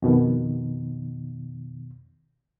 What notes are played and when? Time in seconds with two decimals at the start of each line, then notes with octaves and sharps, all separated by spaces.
0.02 F2 B2 D#3